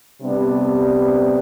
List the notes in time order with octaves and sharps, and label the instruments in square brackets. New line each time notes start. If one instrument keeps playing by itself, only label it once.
[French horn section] C3 G3 B3 D4